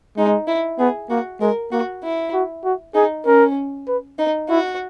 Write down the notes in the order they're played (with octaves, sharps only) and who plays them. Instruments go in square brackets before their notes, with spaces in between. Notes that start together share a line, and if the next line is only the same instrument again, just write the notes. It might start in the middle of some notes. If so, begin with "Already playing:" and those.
[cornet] G#3 [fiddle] D#4
[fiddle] E4
[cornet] B3 [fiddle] G#4
[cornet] A#3 [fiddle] F#4
[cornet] G#3 [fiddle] A#4
[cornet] A#3 [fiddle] F#4
[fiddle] E4
[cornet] F#4
F#4
[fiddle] D#4 [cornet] G#4
[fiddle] C#4 [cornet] A#4
[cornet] B4
[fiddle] D#4
[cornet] E4 [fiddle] F#4